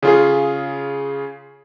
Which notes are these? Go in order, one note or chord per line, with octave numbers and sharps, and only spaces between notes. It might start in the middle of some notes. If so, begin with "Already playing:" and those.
C#3 F4 G#4